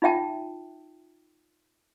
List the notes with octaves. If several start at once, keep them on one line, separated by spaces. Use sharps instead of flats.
D#4 F4 E5 G5 A5